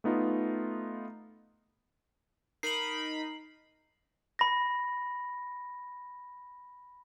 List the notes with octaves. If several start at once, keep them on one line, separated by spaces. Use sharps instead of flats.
A3 B3 D#4 F4
D#4 A#4 B5 C7 F#7
B5 A#6